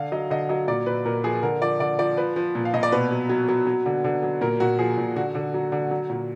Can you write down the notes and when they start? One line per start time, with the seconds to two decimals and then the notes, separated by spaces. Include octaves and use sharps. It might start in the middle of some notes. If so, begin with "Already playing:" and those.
Already playing: D3 F5
0.12 F#3 D#5
0.30 D3 D#5
0.49 F#3 D#5
0.68 A#2 D5
0.86 A#2 B4
1.05 A#2 A#4
1.24 F3 G#4
1.43 D3 A#4
1.62 F3 D5
1.80 D3 D5
1.99 F3 D5
2.17 F3 B4
2.36 F3
2.55 A#2
2.65 F5
2.74 A#2 D#5
2.83 D5
2.92 B2 B4
3.11 F#3
3.29 F#3
3.49 F#3
3.67 F#3
3.86 D3
4.04 D3
4.23 F#3
4.41 A#2 A#4
4.60 A#2 F#4
4.79 F3 G#4
4.98 A#2
5.16 D3 F#4
5.35 D3
5.54 F#3
5.72 D3
5.91 F#3
6.10 A#2